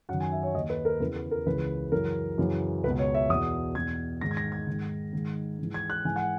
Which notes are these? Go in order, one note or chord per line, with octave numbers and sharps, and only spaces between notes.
F#2 D#3 F#5
G#5
E5
C#5
D#2 D#3 D#5
B4
A#4
E2 C#3 E3 B4
B4
A#4
C#2 C#3 E3 B4
F#2 C#3 E3 A#4
F#2 C#3 E3
C#2 B2 B4
C#5
E5
E2 B2 D#6
E2 B2 G#6
G#2 D#3 A#6
G#6
A#6
G#6
G#2 D#3
G#2 D#3
G#2 E3
G#6
F#6
G#2 E3 G#5
F#5